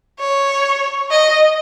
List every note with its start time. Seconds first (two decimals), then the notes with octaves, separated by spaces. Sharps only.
0.20 C#5
1.11 D#5